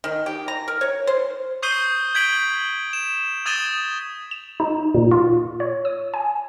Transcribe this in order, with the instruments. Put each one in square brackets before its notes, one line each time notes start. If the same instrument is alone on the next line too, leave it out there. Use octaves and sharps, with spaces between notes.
[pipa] D#3
G4
A#5
A#4
C#5
C5
[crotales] C#6 D#6 G6 C7 D#7 G7
G6 G#6 B6 D7 F#7 G7
E7
D#6 G#6 A6 D#7 E7 G7
[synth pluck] E7
D#4
A#2
F4
C#5
D#6
G#5